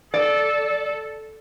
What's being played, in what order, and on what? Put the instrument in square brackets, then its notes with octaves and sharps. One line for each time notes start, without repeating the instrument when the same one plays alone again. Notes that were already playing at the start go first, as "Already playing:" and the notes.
[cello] A4 [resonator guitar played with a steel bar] D5